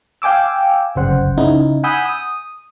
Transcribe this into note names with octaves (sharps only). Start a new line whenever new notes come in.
F5 G5 G#5 D6 E6
G1 C2 F#2 C#3 C5 F#5
C#3 D#4 E4
F#5 G#5 B5 D#6 E6 G6
D#6